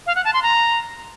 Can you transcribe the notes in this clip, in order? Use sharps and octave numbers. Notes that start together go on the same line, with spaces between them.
F5
F#5
A5
C6
A#5